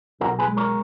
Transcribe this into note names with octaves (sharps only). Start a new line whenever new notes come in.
B1 F#4 A#4
G#4 B4
G#3
A#4 C#5